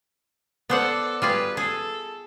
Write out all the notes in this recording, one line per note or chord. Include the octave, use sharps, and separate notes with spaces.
B3 A4 C5 D5 F#5
G3 F4 G#4 B4
G#4 A4